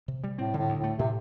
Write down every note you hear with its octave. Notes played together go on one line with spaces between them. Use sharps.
C3
G3
A2 C4
A2 D3
D2
A2 A3
A2 C3